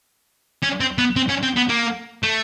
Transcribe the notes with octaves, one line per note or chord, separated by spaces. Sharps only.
C#4
C4
B3
C4
C#4
C4
B3
A#3
A3